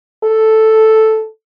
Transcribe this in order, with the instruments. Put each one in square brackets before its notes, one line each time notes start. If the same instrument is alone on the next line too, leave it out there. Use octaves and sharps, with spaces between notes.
[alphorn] A4